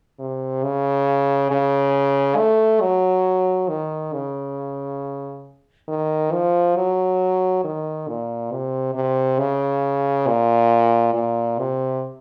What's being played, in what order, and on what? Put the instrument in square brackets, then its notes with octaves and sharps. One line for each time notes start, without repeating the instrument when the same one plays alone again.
[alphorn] C3
C#3
C#3
A3
F#3
D#3
C#3
D#3
F3
F#3
D#3
A#2
C3
C3
C#3
A#2
A#2
C3